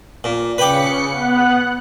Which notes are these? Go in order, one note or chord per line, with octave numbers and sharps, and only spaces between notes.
A#2
C#3 B4 G5 D6 C#7
B3 F#5 F#6